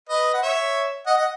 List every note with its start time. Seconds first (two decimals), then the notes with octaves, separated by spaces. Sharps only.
0.09 B4 D#5
0.34 F#5
0.42 C#5 E5
1.07 D#5 F#5
1.18 D#5 F#5